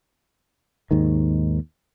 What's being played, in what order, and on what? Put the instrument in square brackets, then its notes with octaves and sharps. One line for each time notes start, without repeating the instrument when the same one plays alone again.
[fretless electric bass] D#2 G#2 D#3